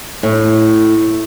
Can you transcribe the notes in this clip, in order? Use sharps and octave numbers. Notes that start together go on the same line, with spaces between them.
A2